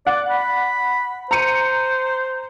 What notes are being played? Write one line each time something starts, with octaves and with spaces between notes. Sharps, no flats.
D5 F#5
B5
C5 A#5 C#7 D#7